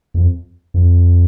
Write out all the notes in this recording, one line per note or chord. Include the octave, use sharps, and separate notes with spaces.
E2
F2
F2